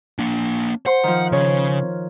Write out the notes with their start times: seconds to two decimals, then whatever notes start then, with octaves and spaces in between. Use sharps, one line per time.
0.19 A#3 D4
0.86 C5 F#5 C6
1.03 D#3 F3
1.32 C#3 C#5